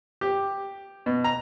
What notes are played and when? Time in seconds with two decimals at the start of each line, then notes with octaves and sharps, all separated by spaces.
0.21 G4
1.06 B2
1.24 A#5